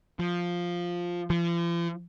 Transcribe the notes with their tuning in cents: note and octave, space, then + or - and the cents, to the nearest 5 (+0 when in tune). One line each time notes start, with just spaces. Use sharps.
F3 +5
F3 -45